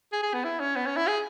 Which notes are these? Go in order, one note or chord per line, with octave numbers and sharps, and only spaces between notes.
G#4
G#4
B3
E4
C#4
B3
C#4
E4
G#4